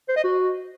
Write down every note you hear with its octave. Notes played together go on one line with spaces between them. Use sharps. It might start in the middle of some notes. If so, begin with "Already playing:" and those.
C5
D#5
F#4